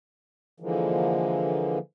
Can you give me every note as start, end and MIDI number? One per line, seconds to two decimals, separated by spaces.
0.60 1.79 50
0.60 1.79 52
0.60 1.79 53
0.60 1.79 56
0.60 1.79 58